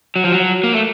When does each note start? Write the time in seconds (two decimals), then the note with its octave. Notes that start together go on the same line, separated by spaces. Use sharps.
0.16 F#3
0.24 F3
0.32 F#3
0.64 A#3
0.73 A3